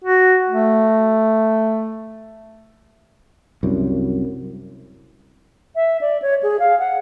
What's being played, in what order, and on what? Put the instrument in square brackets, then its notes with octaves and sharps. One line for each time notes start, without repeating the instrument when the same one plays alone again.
[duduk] F#4
A3
[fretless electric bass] C2 F#2
[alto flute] E5
D5
C#5
G#4
F5
F#5